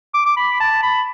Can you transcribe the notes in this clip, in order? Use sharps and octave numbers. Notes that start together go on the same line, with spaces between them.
D6
D6
B5
A5
B5